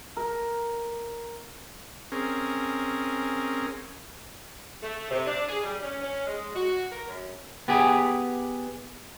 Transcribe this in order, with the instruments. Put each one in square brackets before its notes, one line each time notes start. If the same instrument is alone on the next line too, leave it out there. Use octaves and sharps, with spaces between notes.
[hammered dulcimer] A#4
[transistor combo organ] C4 C#4 G#4 A#4
[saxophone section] A3
C3
D4
G#4
G3
C#4
C#4
G#3
F#4
A#4
F#2
[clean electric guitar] B3 G4 G#4